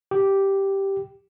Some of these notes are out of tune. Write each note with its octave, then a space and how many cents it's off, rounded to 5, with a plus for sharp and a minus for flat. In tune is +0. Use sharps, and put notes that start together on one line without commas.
G4 -5